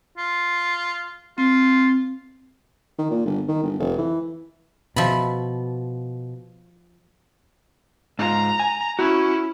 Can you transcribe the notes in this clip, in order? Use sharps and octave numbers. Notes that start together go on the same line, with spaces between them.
F4
C4 F4
D#3
A#2
G1
D#3
G1
F1
E3
B2 F3 E5 B5
G#2 F4 A#5
G#5
C#4 E4 F#4